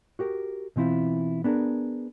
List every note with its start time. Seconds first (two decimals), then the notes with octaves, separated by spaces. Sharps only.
0.19 F#4 G4 A#4
0.76 B2 E3 C4 E4 F4
1.44 B3 D4 G#4 A#4